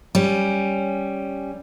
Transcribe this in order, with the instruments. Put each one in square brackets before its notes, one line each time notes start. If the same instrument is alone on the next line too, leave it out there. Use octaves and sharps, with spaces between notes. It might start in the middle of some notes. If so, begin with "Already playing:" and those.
[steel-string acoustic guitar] G3 C#4